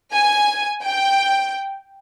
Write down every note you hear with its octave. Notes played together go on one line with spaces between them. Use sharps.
G#5
G5